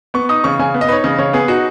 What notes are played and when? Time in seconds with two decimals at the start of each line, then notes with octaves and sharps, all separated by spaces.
0.14 B3 C#6
0.29 D#4 D#6
0.44 C#3 C#6
0.59 C#3 G#5
0.74 B3
0.81 D#5
0.88 D#4 B4 C#5
1.04 C#3 D#5
1.19 C#3 C#5
1.33 B3 G#4
1.48 D#4 F#4